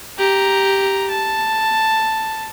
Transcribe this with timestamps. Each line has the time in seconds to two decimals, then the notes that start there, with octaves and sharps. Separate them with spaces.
0.18 G4 A#5
1.09 A5